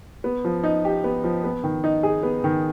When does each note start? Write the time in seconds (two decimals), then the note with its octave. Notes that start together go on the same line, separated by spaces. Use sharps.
0.24 B3
0.44 F3
0.64 D#4
0.85 G4
1.04 B3
1.24 F3
1.44 B3
1.63 D#3
1.84 D#4
2.03 G#4
2.23 B3
2.44 D#3